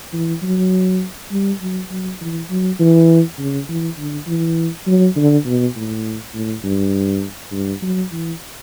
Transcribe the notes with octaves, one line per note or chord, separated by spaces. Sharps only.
E3
F#3
G3
F#3
F#3
E3
F#3
E3
C#3
E3
D3
E3
F#3
D3
B2
A2
A2
G2
G2
F#3
E3